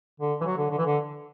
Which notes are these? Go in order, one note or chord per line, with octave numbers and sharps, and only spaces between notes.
D3
E3
F#3
D3
D3
E3
D3